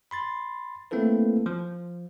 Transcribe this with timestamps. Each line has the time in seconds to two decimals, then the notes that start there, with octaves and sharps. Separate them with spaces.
0.11 B5 C6 A6
0.91 A3 A#3 C4 E4 A4 B4
1.46 F3